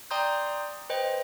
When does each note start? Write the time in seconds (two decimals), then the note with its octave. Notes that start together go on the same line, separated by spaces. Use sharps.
0.11 D5 G5 A#5 C6 D#6 G6
0.90 B4 C5 D#5 G5